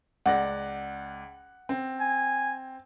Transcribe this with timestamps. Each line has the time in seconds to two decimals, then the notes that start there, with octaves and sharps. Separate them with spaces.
0.26 C#2 D5 F#5 A#6
1.69 C4
2.00 G#5